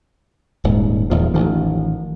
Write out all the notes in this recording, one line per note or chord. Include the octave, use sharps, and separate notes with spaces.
D#1 G#2
D#1 E2 F3
A1 D#3 F3